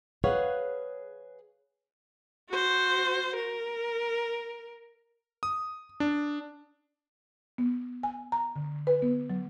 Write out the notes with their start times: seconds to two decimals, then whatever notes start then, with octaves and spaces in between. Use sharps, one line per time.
0.24 G#4 B4 C#5 F5 F#5
2.49 F#4 C5
3.36 A#4
5.43 D#6
6.00 D4
7.58 B3
8.03 G#5
8.32 A#5
8.56 D3
8.87 B4
9.02 B3
9.30 F#3